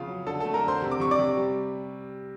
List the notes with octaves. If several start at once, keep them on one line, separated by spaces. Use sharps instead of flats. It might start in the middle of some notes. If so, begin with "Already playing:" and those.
Already playing: C#3 F3 B3 F4 F5
F#3
D3 A4 A5
A4 A5
A3
A#4 A#5
D3 C5 C6
C3
D6
C3 C#6
D5 D6
C3
G3